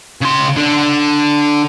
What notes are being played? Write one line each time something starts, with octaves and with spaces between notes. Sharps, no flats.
C#3 C6
D3